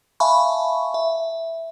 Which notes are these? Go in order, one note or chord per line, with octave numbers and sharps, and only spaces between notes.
E5 F5 G#5 A5 B5 C#6
E5